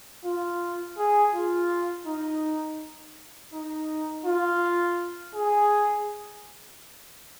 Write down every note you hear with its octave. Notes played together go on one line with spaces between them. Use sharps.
F4
G#4
F4
D#4
D#4
F4
G#4